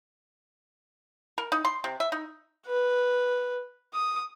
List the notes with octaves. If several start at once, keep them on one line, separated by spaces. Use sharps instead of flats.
A#4
D#4
C6
C3
E5
D#4
B4
D#6